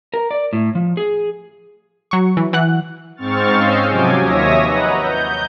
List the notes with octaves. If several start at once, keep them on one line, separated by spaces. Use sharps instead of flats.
A#4
D5
A2
F3
G#4
F#3 C#6
E3
E3 F#5 F#6
G#2 C4 C#6 F6 A6
C#4 D#5 F5 E6 G6 C7
C3 F3 F#3 G#5 D6
D#2 C#5 E5 D#6 A#6
B4 D#5 F#5 A#5
G6